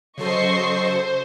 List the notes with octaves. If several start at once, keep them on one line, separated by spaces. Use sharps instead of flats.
C#3 F#3 A4 C5 D#5 C#6 C7